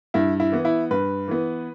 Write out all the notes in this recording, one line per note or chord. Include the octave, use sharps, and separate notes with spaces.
G2 E4
E4
E3 B3
E4
G2 B4
E3 B3